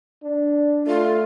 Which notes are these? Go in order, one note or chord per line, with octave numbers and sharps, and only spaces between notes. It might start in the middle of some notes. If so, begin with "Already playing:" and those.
D4
A3 F4